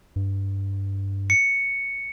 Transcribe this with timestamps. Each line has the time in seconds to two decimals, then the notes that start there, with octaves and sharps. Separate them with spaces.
0.16 G2
1.30 C#7